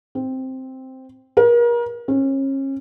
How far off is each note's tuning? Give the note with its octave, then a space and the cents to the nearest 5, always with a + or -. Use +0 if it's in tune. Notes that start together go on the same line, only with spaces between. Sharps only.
C4 +0
A#4 +35
C#4 -35